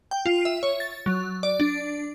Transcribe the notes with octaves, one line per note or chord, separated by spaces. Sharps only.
G5
F4
E5
C#5
A6
F#3
D5
D4